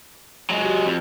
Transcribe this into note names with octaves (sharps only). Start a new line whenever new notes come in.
F#3 G#3
F#4 G4
F2